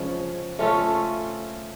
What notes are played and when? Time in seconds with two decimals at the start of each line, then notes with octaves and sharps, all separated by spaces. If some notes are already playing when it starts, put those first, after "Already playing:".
Already playing: C#3 F3 G#3 C#4
0.59 A3 C#4 F4 A4